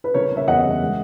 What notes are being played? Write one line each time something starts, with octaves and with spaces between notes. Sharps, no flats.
B4
C#3 A#4 C#5
C#3
C#5 E5
E2 D#5 F#5
E2
G#3